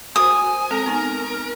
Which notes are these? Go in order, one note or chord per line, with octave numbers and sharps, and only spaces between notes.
F#4 A#4 C5 G#5 D#6
G#3 C4 A4 A#4
B3 D#4 G#5